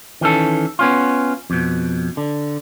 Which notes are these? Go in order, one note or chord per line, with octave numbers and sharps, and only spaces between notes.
D#3 E3 C#4 A4
B3 C#4 F4
F2 B2
D3